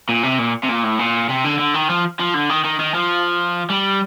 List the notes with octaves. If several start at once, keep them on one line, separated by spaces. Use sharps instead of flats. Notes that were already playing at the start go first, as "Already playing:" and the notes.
A#2
C3
A#2
C3
A#2
A2
A#2
C3
D3
D3
D#3
F3
F3
D3
D#3
D#3
D#3
F3
G3